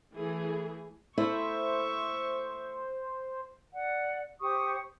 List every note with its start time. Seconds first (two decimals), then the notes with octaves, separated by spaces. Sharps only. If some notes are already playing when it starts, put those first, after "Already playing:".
0.14 E3 A3 G#4
1.18 A3 E4 C5 E5 C#6
3.73 D5 F#5
4.41 G4 C5 C#6 D#6